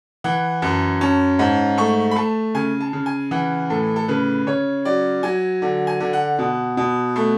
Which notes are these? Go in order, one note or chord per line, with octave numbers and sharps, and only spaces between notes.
E3 F#5
F#2 A5
C#4 A5
G#2 A5
A3 C#6
B5
A3 A5
C#3 G#5
A5
C#3
G#5
E3 F#5
A2 A4
A4
C#3 B4
C#3 C#5
F#3 D5
F#3 G#5
D3
G#5
D3
F#5
B2
B2
A3